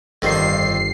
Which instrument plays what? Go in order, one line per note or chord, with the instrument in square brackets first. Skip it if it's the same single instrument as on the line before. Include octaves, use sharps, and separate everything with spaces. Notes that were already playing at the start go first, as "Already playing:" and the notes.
[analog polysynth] G1 C7 [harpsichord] F2 D#3 G3